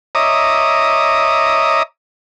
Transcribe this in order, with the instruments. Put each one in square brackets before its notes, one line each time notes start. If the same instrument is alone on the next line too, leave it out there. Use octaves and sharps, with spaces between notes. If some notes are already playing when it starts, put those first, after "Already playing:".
[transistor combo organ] C#5 D#5 E5 A#5 D6 D#6